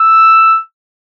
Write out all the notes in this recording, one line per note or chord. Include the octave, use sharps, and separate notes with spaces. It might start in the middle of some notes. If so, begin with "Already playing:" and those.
Already playing: E6